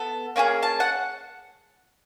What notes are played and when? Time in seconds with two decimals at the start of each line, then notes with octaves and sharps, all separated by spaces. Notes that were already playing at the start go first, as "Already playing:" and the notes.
Already playing: B3 A4
0.36 A#3 C#4 F4 G#4
0.62 A5
0.80 F#5